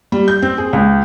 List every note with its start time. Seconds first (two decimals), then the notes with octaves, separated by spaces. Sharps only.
0.12 G3
0.28 G6
0.42 C4
0.58 G#4
0.73 C#2